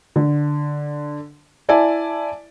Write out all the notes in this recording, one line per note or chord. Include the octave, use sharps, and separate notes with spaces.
D3
E4 D5 E5 G#5 A5